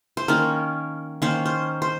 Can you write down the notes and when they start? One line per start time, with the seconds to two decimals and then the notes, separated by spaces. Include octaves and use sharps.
0.17 C5
0.28 D#3 A#3 C#4 A#4
1.22 D#3 A#3 C#4 C5
1.46 C5
1.82 C5